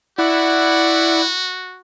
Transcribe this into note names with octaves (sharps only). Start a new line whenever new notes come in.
E4 F#4 D5 F#5